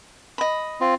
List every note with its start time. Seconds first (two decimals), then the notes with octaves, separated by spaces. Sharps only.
0.38 D#5 B5
0.81 C4 F4